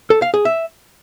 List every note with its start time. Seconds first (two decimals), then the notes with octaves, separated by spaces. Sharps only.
0.10 A4
0.22 F5
0.34 G#4
0.45 E5